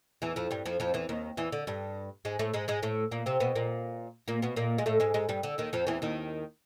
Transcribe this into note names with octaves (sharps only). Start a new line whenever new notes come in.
E2 E3
F2 F3
G2 G3
F2 F3
F2 F3
E2 E3
D#2 D#3
E2 E3
D3
G2 G3
G#2 G#3
A2 A3
G#2 G#3
G#2 G#3
A2 A3
A#2 A#3
C3 C4
B2 B3
A#2 A#3
A#2 A#3
B2 B3
A#2 A#3
G#3
A2 A3
G#2 G#3
G#2 G#3
G2 G3
D3
D#2 D#3
F2 F3
E2 E3
D#2 D#3